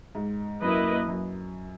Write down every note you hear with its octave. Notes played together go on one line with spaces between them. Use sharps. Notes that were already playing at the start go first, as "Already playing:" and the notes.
G#2
F#2 A#3 E4 B4 D#5
F#2